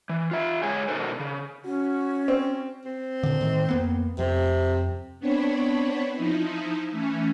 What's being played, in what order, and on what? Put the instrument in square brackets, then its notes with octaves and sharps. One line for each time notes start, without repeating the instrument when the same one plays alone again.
[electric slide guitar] E3
F4 E5
G#3 G#4 C#5 F#5 G#5
B2 D#4 A4 A#4 C5
C#3
[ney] C#4 [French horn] F#4
[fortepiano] C4
[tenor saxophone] C4
[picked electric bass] A#2 D3
A2 D#3
F2 A#3 B3
[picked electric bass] F2 [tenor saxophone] C3
[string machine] B3 C4 D4 C#5 B5
F3 D#4 E4
E3 A3 C#4